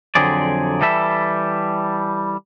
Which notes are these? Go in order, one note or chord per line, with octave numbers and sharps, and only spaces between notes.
F2 D3 F#3 C4 G#4 D5
E3 G3 A4 E5